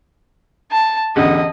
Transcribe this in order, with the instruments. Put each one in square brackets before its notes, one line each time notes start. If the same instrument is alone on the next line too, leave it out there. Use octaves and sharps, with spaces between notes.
[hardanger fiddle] A5
[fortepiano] A1 E2 D3 [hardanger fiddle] D#5